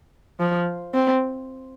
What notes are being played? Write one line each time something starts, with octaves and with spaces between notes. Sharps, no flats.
F3
C4